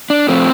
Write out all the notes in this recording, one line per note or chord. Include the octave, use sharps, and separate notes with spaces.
D4
A2 F3 A3 C4